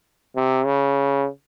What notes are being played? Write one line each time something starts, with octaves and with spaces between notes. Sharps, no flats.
C3
C#3